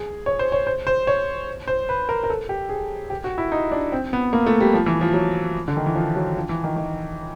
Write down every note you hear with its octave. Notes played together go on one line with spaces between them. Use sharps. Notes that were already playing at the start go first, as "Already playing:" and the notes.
Already playing: G#4
C#5
C5
C#5
C5
C5
C#5
C5
B4
A#4
A#4
A4
G4
G#4
G4
F#4
E4
D#4
D4
C4
B3
A#3
A3
G3
F3
E3
F3
F#3
D3
D#3
E3
F3
F#3
F3
E3
D#3
D#3